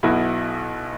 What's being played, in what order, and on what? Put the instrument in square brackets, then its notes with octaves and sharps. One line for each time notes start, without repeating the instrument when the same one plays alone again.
[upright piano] B1 B2 B3 E4